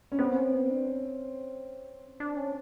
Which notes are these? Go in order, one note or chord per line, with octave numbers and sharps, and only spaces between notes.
C#4
B3 C4
C#4
B3
D4
C#4
D4
C#4